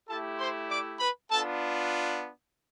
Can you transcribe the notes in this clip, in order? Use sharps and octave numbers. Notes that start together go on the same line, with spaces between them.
A3 E4 G4 A4 A5
C5 C6
D5 D6
B4 B5
B3 D4 F4 A4 A5